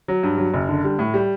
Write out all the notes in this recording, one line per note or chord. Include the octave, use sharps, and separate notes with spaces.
F#3
G2
F#3
F#1
D3
G3
A2
G3